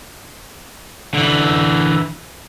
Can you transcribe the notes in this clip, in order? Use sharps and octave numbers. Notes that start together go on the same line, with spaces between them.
D3 E3